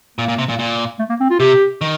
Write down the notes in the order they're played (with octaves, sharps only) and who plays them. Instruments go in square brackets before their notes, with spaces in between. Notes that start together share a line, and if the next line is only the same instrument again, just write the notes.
[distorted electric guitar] A#2 [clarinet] A#3
[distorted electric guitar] A#2
C3
A#2
A#2
[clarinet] A3
A#3
C4
F4
[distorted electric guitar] C3 [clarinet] G4
[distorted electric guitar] D#3